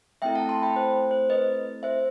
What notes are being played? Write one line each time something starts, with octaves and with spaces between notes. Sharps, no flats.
A3 C4 E4 A4 E5 G5
F#5 A5
A5 C6
G5 B5
C5
C5
B4 D#5
C5 E5